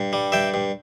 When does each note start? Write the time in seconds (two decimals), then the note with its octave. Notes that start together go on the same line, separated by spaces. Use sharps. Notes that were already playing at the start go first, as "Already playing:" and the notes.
Already playing: G2
0.13 G3
0.32 G2 E5 G5
0.54 G2